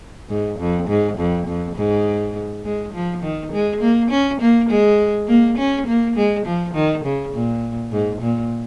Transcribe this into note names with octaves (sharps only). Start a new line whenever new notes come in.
G#2
F2
G#2
F2
F2
G#2
G#3
F3
D#3
G#3
A#3
C#4
A#3
G#3
A#3
C#4
A#3
G#3
F3
D#3
C#3
A#2
G#2
A#2